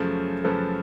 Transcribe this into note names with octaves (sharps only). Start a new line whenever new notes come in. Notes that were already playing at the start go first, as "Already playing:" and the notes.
Already playing: F#2 C#3 F3 A3
F#2 C#3 F3 A3 A4 B4